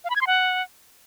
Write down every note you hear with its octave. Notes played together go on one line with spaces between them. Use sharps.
F5
B5
G#6
C6
F#5